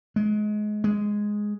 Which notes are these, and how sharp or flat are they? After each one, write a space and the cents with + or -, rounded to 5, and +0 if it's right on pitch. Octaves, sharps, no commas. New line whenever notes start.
G#3 +25
G#3 +0